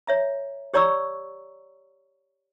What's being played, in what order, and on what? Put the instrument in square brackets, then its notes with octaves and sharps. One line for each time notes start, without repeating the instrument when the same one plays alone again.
[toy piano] C#5 E5 A#5
G4 C#5 D5 A#5 C#6 E6